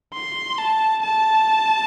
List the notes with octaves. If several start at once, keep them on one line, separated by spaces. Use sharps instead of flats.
C6
A5
A5